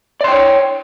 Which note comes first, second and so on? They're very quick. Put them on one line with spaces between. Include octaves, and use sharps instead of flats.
D5 C6 G5 C#5